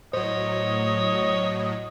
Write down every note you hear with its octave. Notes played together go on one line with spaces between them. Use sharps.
A2 F#3 C5 C#5 D#5